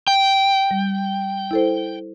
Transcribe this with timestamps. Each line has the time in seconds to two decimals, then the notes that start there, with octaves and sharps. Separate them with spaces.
0.07 G5
0.71 G3
1.51 E4 A4 C5